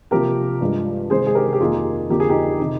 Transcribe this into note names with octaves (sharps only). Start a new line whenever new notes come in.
C3 F3 A#3 G4 A#4
G2 F3 G#3
C3 D#3 G#3 G#4 C5
G#4
G4 A#4
G4
F2 D#3 A#3 F4 G#4
F2 D3 F3 A#3 G4
G#4
D#4 G4
C3 D#3